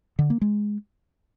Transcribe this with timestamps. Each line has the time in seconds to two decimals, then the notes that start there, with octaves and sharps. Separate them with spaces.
0.19 D3
0.30 A#3
0.41 G#3